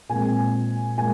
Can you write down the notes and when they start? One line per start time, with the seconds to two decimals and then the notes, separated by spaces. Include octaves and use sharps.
0.09 A#2 G#3 C4 G#5
0.98 A#2 G#3 G#5